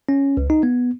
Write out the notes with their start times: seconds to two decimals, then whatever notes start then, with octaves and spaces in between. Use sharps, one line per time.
0.09 C#4
0.37 C#2
0.50 D#4
0.63 B3